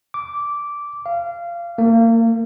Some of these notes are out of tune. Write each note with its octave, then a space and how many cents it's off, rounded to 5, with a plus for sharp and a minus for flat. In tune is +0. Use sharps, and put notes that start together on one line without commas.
D6 -10
F5 -25
A#3 -35